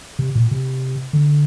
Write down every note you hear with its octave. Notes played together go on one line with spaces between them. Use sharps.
C3
A#2
C3
D3